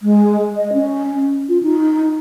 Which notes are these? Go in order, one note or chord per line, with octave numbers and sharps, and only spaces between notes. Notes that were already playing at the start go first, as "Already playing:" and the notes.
G#3
D#5
C#4
F4
D#4